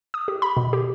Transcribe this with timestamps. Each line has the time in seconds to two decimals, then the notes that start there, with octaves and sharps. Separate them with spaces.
0.14 D#6
0.28 G4
0.42 B5
0.57 B2
0.73 G4